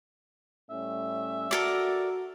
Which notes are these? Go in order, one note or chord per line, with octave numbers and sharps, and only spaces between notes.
A2 G3 C#4 E5
F#4 A4 A#4 D5